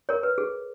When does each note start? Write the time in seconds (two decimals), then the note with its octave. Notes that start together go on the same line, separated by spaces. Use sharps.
0.09 A#4 C#5
0.23 B4
0.38 G#4